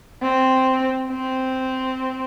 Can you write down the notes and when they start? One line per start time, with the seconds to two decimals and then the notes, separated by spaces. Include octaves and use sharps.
0.22 C4
1.09 C4